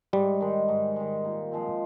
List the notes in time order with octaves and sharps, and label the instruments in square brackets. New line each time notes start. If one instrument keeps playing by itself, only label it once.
[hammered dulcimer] G#2 [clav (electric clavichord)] G3
[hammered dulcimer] D#3 G#3
G#2
D#3 G#3
A#2
F3 G#3 C4